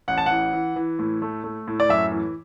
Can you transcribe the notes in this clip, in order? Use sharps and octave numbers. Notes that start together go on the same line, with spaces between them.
A1 F#5
A5
E3 F#5
E3
E3
A2
A3
A3
A2
D5
F#2 E5
E3